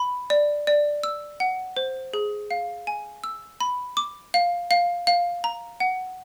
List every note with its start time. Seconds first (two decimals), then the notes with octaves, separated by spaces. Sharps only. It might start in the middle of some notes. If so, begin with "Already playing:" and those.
Already playing: B5
0.30 D5
0.67 D5
1.03 E6
1.40 F#5
1.77 C5
2.14 G#4
2.51 F5
2.87 G#5
3.24 E6
3.60 B5
3.97 D6
4.34 F5
4.71 F5
5.07 F5
5.44 A#5
5.80 F#5